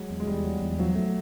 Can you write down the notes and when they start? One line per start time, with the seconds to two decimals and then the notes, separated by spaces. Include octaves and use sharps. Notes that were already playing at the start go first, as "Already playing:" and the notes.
Already playing: F#3 G#3
0.10 E2
0.20 G#3
0.27 E2 G3
0.44 F#3
0.62 E2
0.78 F3 F#3
0.95 A3